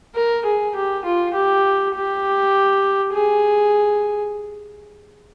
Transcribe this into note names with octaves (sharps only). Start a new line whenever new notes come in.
A#4
G#4
G4
F4
G4
G4
G#4